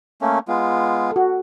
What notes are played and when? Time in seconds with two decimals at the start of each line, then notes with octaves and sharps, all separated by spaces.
0.22 A3 A#3 C#4
0.48 G#3 B3 F4
1.12 F#4 A4